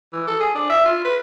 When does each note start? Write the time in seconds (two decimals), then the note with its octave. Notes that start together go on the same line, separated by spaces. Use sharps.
0.13 E3
0.27 A4
0.40 G#4
0.54 D4
0.70 E5
0.85 F4
1.05 B4